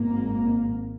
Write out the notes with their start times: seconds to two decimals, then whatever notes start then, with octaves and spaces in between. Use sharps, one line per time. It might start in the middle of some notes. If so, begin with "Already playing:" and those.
Already playing: G#1 G#2 A#3